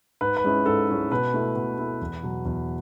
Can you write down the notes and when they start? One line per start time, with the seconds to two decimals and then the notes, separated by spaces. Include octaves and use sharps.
0.21 G#2 B4
0.37 B4
0.44 G#3 C#4 E4
0.66 G#2 A4
0.89 G#3 C#4 E4
1.11 B2 B4
1.34 A3 E4
1.56 B2
1.79 A3 E4
2.01 E2
2.23 B2 F#3
2.45 E2